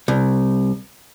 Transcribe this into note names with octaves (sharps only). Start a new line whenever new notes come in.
C2